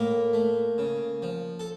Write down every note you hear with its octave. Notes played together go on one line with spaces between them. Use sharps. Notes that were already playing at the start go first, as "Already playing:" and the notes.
Already playing: A2 A#3 A#4
A3
C#3
F3
A4